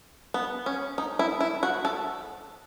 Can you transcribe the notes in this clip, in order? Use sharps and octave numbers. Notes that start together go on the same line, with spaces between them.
B3
C#4
D#4
E4
E4
F#4
A4